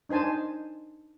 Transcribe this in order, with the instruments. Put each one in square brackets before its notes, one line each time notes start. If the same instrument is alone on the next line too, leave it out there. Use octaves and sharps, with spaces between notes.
[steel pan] D4 D#4 C5 G#5 A5